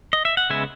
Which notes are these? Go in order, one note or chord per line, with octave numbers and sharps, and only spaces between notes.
D#5
E5
F#5
C#3 G#3 B3 E5 G#5